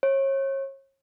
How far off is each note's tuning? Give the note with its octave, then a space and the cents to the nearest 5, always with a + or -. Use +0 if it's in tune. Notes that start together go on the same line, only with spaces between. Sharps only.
C#5 -35